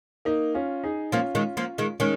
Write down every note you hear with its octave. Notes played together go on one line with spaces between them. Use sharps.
A#3 D#4
C#4 F4
D#4 G#4
F3 A#3 C#4 F4
D#3 G#3
F3 A#3
D#3 G#3
D#3 G#3 C#4